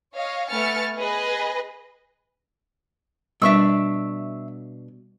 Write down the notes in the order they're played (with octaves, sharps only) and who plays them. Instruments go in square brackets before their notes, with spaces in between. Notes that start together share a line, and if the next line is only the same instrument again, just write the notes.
[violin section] C#5 D#5 F5
A3 B3 G#5 F6 A6 C#7
G#4 B4 D#5
[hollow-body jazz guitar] B2 D4 [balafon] G3 [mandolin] E5 C#6 E6